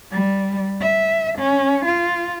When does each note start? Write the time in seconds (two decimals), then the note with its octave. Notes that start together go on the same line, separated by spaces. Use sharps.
0.11 G3
0.81 E5
1.38 C#4
1.85 F4